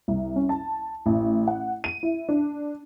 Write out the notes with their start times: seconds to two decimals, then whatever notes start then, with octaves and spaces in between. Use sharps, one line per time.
0.08 C2
0.36 C#4
0.49 A5
1.06 A1
1.48 F#5
1.84 D#7
2.03 E4
2.29 D4